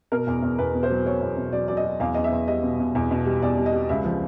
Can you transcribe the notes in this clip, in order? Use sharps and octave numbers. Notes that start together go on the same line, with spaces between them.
B2 A#4
E2
E2
E2 B4
B2
C5
F#3
F#3 C#5
E2
B2
F#3 D5
F#3 D5
D#5
F#3
E2 F5
E2 D#5
E5
E2
G3 D#5
B2
B2
E2
B2
G3
E2 D5
G3
D#5
G3
C#2 E5
F3